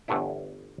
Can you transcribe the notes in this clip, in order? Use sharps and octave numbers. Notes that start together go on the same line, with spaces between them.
G1 E2 G2 A3 D4 E4